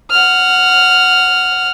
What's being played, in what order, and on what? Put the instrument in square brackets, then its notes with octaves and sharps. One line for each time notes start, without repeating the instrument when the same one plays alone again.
[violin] F#5 F6